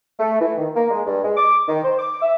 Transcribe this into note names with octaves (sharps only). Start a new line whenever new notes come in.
A3
E3
D#3
A#3
G#3
G2
G#3
D6
D#3
C5
D6
E5